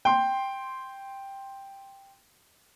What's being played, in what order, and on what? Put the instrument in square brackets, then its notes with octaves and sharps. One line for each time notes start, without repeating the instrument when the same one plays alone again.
[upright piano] G5 C6